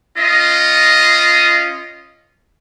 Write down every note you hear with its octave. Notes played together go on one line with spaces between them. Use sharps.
C#4 F4 D#5